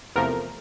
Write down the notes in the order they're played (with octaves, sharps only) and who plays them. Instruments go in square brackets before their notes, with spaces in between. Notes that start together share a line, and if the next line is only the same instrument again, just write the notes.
[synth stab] E2 C3 F3 A3 A#4